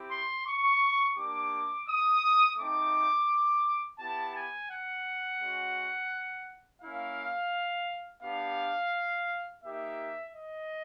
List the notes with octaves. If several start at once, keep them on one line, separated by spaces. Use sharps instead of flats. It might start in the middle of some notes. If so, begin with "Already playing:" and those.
Already playing: C4 E4 G4
C6
C#6
A#3 D4 G4 D6
D#6
A3 C4 D#4 D6
B3 E4 G4 A5
G#5
F#5
G#3 C#4 F#4
A#3 C#4 E4 F5
B3 D4 G4 F5
A#3 D#4 G4 E5
D#5